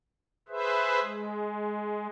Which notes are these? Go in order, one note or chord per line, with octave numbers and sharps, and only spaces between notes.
G#4 B4 C5 E5
G#3